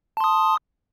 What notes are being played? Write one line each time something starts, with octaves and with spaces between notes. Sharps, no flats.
A5 C6 D#6